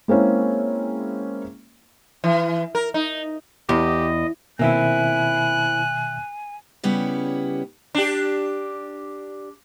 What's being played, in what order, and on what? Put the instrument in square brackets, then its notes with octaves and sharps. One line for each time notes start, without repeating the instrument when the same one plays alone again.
[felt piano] G#3 A#3 C4 C#4 E4
[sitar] E3
A#4
D#4
[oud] E2 [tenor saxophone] G4 [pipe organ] D#5
[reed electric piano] B2 D#3 E5 [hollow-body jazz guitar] A#3 C4 E4 [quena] G#5 [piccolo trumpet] F#6
[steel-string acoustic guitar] C#3 G3 B3 C#4 E4 G4
[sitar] D4 G4